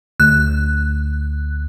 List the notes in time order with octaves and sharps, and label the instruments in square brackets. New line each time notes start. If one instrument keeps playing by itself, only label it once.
[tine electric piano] D2 [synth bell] F#6